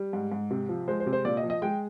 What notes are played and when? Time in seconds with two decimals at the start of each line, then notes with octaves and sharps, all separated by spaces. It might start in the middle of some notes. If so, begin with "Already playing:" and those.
Already playing: G3
0.13 G#2
0.32 G#2
0.51 C3
0.69 F3
0.88 G#3 C5
1.00 C5
1.06 C3
1.13 C5
1.25 A#2 D5
1.37 D#5
1.43 F3
1.50 D#5
1.62 G#3 G5